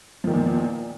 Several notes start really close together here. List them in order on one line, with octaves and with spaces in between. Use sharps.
F3 D#3 E2 A#2